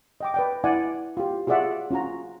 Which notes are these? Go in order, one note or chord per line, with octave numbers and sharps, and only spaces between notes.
D#5 G5 D6
B4 D5 G5
E4 D5 F#5 G#5
F4 G4
F4 F#4 G#4 D5 E5 F#5
C#4 F4 F#4 A#5